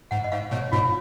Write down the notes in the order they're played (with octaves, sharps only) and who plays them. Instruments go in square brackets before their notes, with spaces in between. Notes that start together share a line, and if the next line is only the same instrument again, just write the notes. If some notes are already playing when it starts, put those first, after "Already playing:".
[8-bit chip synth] G#2 [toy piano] F#5
[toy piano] D#5
[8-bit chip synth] G#2 [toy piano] F5
[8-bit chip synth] G#2 B2 [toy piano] C#5
[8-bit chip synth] G#2 B2 [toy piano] F4